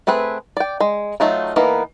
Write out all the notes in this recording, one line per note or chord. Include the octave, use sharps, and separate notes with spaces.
A3 C4 G#4 B4
D5 G5
G#3
F#3 A3 D#4 F4
E3 A#3 B3 D#4 A#4